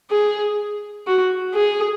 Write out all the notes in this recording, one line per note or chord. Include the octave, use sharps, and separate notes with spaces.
G#4
F#4
G#4